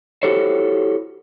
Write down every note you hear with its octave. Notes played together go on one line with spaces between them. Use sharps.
E4 F#4 G4 A4 C5 C#5